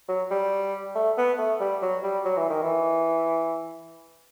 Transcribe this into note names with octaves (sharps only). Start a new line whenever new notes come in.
F#3
G3
A3
B3
A3
G3
F#3
G3
F#3
E3
D#3
E3